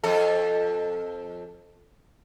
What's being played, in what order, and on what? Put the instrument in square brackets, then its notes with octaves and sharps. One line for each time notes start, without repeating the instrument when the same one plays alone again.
[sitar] F2 A4